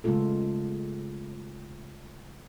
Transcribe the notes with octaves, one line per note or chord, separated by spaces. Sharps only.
C#3 G#3 A3 B3 F4 A4